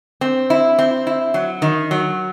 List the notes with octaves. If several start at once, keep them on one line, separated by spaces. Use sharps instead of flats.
C4
E4
C4
E4
F#3
D#3
F#3